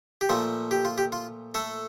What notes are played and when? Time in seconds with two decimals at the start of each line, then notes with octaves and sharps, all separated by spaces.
0.21 G4
0.29 A#2 F3 A3 F4
0.71 G4
0.85 F4
0.98 G4
1.12 F4
1.54 A3 A4